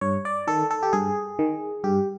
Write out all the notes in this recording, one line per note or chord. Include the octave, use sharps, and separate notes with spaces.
G2 C#5
D5
D#3 A4
A4
G4
G2 G#4
D#3
G2 G4